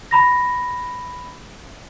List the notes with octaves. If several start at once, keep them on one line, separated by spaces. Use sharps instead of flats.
A#5 B5 A#6